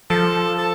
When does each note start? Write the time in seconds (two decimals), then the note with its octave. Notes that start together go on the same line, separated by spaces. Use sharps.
0.10 F3 A4
0.58 A4